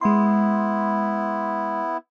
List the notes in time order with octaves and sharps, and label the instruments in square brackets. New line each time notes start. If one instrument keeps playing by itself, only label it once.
[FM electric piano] G#3 C6 [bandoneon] B3 E4